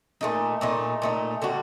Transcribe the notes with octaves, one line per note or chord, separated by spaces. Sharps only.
A#2 A3 D#4
A#2 A3 D#4
A#2 A3 D#4
D3 G3 D4 F#4